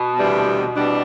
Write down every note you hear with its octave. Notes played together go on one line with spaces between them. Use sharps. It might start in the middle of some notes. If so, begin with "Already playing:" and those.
Already playing: B2
D2 C3 E3 G3 D4
C3 E3 G3 D4